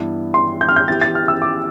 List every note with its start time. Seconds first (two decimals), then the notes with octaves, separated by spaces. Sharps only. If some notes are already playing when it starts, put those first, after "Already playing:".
Already playing: G2 E3 B3 E4
0.34 C6
0.61 G6
0.69 F6
0.76 G6
0.88 E3 B3 E4 G4 A6
1.01 A6
1.15 F6
1.28 E6
1.42 D6